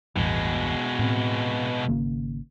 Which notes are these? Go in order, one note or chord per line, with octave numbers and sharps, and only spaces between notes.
A1 E2 G2 B2 G#3
A2 C4
G#1 C#3 A#3